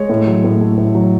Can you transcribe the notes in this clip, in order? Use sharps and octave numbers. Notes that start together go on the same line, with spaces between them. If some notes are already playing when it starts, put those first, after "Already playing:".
Already playing: G#3 C#5
A2
F#3
A2
A3
A2
F#3